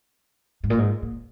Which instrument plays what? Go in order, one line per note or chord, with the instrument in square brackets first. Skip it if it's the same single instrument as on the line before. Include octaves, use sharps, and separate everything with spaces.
[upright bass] G#2
A#2
G#2
A#2